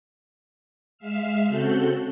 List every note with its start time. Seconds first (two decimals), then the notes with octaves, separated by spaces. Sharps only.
0.98 G#3 E5 F5 E6 F6
1.48 C#3 C4 F#4 A4 F#6 G6